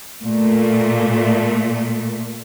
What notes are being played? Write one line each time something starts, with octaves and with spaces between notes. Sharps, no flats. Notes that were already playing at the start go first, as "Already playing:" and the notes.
A#2 A3